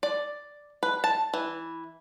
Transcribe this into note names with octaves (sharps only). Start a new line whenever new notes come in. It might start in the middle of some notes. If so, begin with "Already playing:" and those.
D5
B4
A5
E3